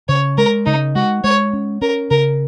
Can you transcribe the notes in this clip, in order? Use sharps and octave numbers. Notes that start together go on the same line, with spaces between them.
C#3 C#5
G#3 A#4
C#3 D#4
G#3 F#4
G#3 C#5
C#4
C#4 A#4
C#3 A#4